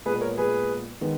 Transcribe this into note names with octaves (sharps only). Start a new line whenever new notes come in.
A#2 G#3 B3 G#4 B4
A#4 C#5
G#4 B4
D#3 G#3 B3